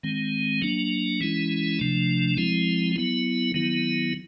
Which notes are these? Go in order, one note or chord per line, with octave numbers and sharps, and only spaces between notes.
D#3 G#3 C4
F#3 A#3 D4
E3 G#3 C#4 E4
C3 F3 A3 D4
F3 G#3 C4 E4
F#3 B3 E4
D#3 F#3 B3 E4